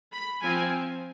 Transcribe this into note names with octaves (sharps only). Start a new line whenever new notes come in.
B5
F3 C4 G#5